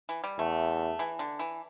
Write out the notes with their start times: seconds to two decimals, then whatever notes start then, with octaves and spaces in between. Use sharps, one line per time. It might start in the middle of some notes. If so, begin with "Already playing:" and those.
0.09 E3
0.24 G3
0.38 E2 A3
0.99 E3
1.19 D3
1.39 E3